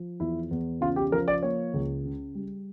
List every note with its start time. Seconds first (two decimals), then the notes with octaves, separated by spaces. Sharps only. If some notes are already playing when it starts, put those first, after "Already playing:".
Already playing: F3
0.20 E2 E4
0.51 E2
0.81 C#3 F4
0.96 G4
1.12 F3 A#4
1.28 D5
1.43 A#3 C#5
1.74 C#2
2.05 C#3
2.35 G3